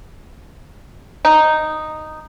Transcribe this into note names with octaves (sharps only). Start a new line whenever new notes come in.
D#4